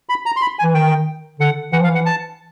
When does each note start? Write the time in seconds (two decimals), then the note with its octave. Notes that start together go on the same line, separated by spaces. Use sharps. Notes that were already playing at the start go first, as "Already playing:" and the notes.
0.09 B5
0.26 A#5
0.36 C6
0.41 B5
0.59 G#5
0.63 E3
0.74 D#3 G5
1.40 D3 F#5
1.72 E3 F#5
1.80 F3
1.84 F5
1.88 E3
1.95 F#5
2.06 A5